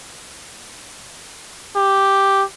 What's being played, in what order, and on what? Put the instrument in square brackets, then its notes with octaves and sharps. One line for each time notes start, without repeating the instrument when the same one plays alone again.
[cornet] G4